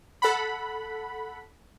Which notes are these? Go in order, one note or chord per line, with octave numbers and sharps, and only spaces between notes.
A4 F#5 B5